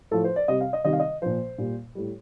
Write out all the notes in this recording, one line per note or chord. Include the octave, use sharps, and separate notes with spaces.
A2 F3 A4
C5
D5
C3 G3 D#5
F5
D#5
C3 D#3 G3 D#5
F5
D#5
A#2 F3 C5
A#2 G3
A2 G3